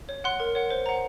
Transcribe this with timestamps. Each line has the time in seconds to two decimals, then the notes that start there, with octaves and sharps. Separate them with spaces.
0.09 C#5
0.24 F#5 C6 F#6
0.40 A#4
0.55 C#5 F#5
0.70 C5
0.86 F#5 A#5